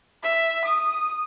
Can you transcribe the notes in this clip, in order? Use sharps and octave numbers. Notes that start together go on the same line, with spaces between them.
E5
D#6